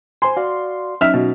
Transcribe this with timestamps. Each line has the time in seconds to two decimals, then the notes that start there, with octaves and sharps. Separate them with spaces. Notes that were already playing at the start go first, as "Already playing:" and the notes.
0.22 C5 G#5 C6
0.37 F#4 D5 F5
1.01 F#3 C#4 D#4 E5 F6
1.14 B2